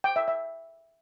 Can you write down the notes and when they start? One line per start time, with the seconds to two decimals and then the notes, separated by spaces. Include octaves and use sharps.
0.04 G5
0.16 E5
0.28 E5